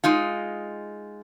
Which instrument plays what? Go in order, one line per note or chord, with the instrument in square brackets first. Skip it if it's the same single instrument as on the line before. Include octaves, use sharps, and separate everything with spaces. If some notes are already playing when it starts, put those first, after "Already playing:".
[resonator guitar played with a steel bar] G#3 D#4 F4